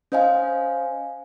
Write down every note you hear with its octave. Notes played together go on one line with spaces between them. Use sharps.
C#4 C5 D#5 F5 G#5